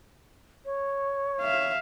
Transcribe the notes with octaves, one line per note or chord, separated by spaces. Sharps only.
C#5
E5 F5